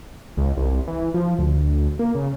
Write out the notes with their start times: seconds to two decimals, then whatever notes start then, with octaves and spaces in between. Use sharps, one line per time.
0.37 C#2
0.57 C2
0.87 E3
1.14 F3
1.39 D2
1.99 A#3
2.15 C#3